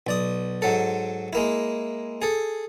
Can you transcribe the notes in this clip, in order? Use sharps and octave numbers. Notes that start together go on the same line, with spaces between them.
B1 D5 D#6
G#2 F#3 A4
G#3 A#3 E4
G#4 A4